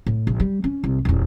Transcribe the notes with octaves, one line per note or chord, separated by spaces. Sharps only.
A2
A#1
G3
C#4
C2
D#1 E2